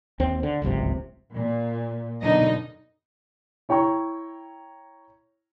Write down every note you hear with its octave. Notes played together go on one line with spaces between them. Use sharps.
D#2 C4
D3
D1 G#1 C#2 C3
A#2
F#2 B2 D3 D4 D#4 D#5
E4 C#5 G5 A#5 C#6